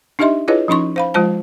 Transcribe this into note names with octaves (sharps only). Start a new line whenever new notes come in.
D4 D#4 G4 D#5 E5 C6
E4 F4 G#4 B4 C#5 D#5
F3 C#4 D#4 C6 C#6
C5 F5 B5
F3 G#3 F4 C5 A5